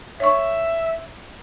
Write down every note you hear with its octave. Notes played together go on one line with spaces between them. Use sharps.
C#5 E5 C#6